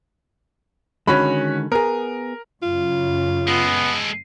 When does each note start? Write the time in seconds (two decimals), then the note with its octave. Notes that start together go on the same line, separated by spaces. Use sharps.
1.07 D3 D#3 G#3 C#4 F#4 B5
1.72 B3 G#4 A#4
2.62 F#2 C#3 F4
3.48 G#3 B3 A4